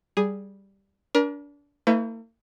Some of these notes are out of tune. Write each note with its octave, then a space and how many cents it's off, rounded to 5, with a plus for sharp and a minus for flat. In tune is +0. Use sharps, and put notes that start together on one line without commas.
G3 +0 G#4 +0
D4 -30 A#4 +35
A#3 -45 E4 -25 B4 +35